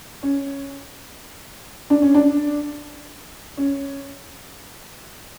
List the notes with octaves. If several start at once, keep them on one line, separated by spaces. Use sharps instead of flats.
C#4
D4
C#4
D4
C#4